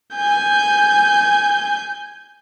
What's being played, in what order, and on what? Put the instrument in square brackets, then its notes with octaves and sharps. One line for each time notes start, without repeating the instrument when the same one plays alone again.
[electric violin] G#5 G6